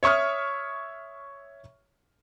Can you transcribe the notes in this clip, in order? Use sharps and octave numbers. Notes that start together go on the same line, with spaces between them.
C#5 E5 C#6 D#6 F6